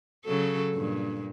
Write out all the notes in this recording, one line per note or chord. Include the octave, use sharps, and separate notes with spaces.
C#3 F#3 A4
G2 A#2